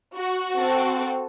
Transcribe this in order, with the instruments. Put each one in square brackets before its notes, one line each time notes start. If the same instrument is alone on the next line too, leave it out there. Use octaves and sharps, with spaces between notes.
[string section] F#4
[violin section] C4 A4